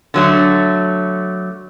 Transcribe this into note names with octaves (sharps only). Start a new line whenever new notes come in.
D3 F#3 A3